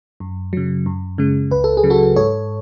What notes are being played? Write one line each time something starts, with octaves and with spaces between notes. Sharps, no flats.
F#2
C#3 F#3
F#2
C#3 G#3
C#2 B4
A4
G#4
C#3 F#3
F#4 A4
G#2 A4 C#5